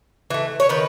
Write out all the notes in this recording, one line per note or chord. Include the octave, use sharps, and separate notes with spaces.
E3 A3
C#5
D#3 B4